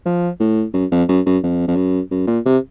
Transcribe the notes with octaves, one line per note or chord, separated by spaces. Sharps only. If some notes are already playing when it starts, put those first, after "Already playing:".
F3
A2
F#2
F2
F#2
F#2
F2
F2
F#2
F#2
A#2
C3